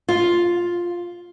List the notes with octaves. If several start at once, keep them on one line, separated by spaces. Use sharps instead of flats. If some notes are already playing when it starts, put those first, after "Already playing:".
F4